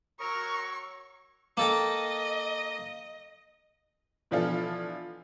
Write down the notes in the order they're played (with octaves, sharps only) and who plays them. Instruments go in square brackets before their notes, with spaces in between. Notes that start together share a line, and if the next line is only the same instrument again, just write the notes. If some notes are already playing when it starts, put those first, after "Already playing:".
[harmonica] F#3 C#5 E6 [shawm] A#4 [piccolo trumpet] A#5 [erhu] C#6
[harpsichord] A#3 A4 G5 [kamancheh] D#5
[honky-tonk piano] B2 E3 F3 D4 F4 A4